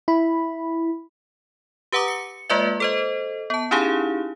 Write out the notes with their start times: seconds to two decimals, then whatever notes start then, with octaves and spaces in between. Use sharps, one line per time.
0.08 E4 B5
1.92 G4 B4 F#5 A#5 D6 D#6
2.08 C#7
2.50 G#3 A#3 F4 B4 D5 E5
2.80 A4 C5 D#5
3.50 B3 A5
3.71 C#4 D#4 E4 G4 G#4 F5